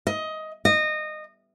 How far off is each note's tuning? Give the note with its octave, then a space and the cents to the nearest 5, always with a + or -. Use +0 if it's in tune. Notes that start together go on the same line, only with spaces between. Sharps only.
D#5 +15
D#5 -20